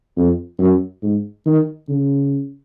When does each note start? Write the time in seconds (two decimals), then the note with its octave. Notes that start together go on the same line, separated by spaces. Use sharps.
0.17 F2
0.59 F#2
1.03 G#2
1.46 D#3
1.89 C#3